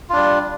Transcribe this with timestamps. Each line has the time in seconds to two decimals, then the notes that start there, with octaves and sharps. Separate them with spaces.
0.09 F4
0.13 D4
0.16 G3